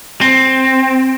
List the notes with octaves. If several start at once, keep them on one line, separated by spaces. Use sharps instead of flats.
C4